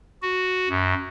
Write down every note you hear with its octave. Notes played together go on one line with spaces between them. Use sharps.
F#4
F#2